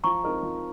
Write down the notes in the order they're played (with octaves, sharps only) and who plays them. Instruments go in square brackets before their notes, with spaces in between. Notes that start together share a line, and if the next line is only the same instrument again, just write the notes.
[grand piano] F3 [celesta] A#5 C#6
[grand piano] C4 D#4 A#4 D#5
F3